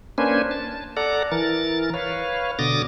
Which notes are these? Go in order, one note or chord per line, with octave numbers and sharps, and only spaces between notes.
A#3 C#4 D4 B4 C5 G#5
A5
A4 D5 F#5 A#5
E3 A#4 A6
B4 C#5 F5
B2 D3 D6 D#6 A6 A#6